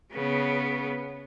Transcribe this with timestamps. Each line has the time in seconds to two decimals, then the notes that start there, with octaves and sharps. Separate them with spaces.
0.14 C#3 B3